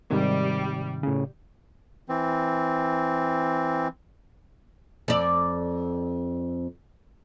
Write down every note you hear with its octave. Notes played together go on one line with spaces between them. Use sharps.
G#2 C3 D#3 G3
A2 C#3
E3 C4
F2 D5